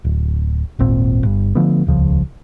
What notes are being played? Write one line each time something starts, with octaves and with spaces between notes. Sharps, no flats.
D1
D#1 G#1 A#2 C4
G1 G2
D3 F3 A3 B3
D#1 C#2 C#3 F3